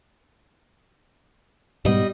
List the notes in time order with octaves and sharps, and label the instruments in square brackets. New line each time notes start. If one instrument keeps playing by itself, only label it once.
[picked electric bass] G#2 B2 B3 [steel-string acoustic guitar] G3 D#5